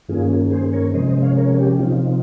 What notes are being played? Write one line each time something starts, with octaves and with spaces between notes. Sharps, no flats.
G2 D#3 A#3 C#4 F4 G#4
G#4 C5
A#4 C#5
C3 F3 G#3 C#4 C5 D#5
C5 D#5
C#5 F5
A#4 C#5
G4
C3 F3 C4 D#4 F4